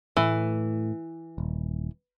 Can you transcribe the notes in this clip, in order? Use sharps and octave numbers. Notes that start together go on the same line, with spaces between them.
A2 E3 A3
D#1